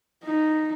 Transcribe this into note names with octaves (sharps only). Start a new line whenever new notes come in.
D#4